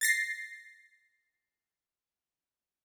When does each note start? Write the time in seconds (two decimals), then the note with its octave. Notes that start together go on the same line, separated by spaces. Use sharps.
0.01 A6 A#6 C7